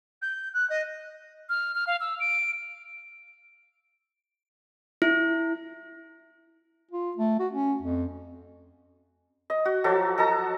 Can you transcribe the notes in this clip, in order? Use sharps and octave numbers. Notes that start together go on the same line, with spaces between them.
G6
F#6
D#5
F6
F6
F5
E6
D7
E4
F4
A3
F#4
C#4
F2
D#5
F#4
F3 F#3 F#4 A4
A4 D#5 A5 A#5